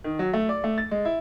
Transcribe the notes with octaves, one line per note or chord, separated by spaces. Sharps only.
D#3
F#3
A3
D5
A3
A6
G#3
E4